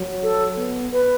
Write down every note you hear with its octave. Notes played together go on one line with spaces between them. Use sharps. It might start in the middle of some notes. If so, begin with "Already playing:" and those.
Already playing: F#3
A4
B3
B4